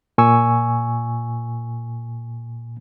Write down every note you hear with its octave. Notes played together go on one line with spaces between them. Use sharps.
A#2 G#5 C#6 E6